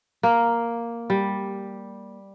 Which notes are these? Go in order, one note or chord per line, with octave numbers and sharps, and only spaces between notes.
A#3
G3